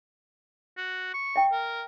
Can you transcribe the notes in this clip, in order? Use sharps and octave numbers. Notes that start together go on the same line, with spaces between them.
F#4
C#6
E5 G5
A#4